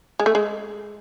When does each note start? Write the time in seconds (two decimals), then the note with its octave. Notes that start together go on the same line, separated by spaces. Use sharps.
0.20 G#3
0.26 A3
0.35 G#3